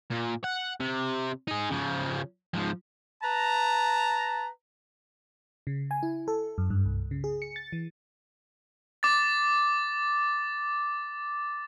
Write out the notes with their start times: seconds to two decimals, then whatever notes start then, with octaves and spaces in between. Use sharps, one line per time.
0.11 A#2
0.44 F#5
0.80 C3
1.48 D#4 G#4
1.70 C#3 F3
2.54 G#2 F3
3.24 B4 A5 A#5
5.67 C#3
5.91 G#5
6.03 E4
6.28 A4
6.58 F#2
6.70 G2
6.85 C2
7.11 C#3
7.24 G#4
7.42 C#7
7.56 A6
7.73 E3
9.03 D6 A6